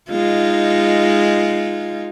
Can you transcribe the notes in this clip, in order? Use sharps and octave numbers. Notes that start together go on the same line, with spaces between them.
G#3 D#4 F4